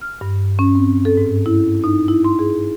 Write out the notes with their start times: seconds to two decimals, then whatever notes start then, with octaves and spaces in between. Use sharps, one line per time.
0.01 F6
0.21 G2
0.59 C#4
0.75 C4
1.05 A4
1.17 G#2
1.46 E4
1.84 D#4
2.08 E4
2.24 C6
2.39 G#4